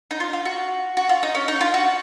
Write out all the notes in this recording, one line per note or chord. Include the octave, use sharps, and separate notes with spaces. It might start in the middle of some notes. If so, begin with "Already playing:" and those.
D#4
F4
F4
F#4
F#4
F4
D#4
C#4
D#4
F4
F#4